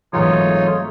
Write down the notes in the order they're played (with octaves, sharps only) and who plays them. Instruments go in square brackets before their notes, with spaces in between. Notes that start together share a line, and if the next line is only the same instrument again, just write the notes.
[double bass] G#1 A3 [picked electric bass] E3 F#3 G#3 [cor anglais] D#4 [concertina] F4 C#5